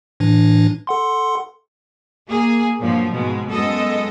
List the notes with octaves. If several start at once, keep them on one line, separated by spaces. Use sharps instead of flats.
A2 E3 D4
A4 F#5 C6
A#3 G#4
G2 A#2 F3 F#3
G#2 B2 G#3
F#2 G#3 B3 A4 D#5